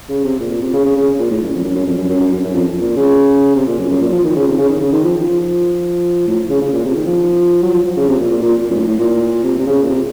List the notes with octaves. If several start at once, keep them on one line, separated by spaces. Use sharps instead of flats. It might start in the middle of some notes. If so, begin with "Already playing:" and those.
C#3
C3
A#2
A#2
C3
C#3
C#3
C#3
A#2
A2
F#2
F2
F#2
F#2
F2
F#2
F#2
F#2
F#2
F#2
F2
A#2
C#3
C3
A#2
F#2
F#2
A#2
F3
D#3
C#3
C3
C#3
D#3
C#3
D#3
F3
F3
A2
C#3
C#3
A#2
C3
D#3
F3
F#3
F3
F3
C#3
C3
A#2
A#2
A#2
A#2
F#2
A2
A2
A#2
C3
C3
C#3
A#2
C3